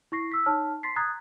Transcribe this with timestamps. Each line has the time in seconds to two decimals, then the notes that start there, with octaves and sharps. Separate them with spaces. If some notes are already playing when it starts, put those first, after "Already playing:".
0.12 E4 C#6 A#6 C7
0.32 E6 B6
0.46 D#4 C#5 A5 F6
0.83 C6 A6 B6 C7
0.96 A#5 D#6 F#6 G#6 A6